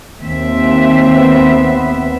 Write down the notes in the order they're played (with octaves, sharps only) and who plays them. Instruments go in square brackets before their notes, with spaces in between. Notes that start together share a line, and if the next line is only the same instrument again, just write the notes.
[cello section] D#2 C4 E5
[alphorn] B3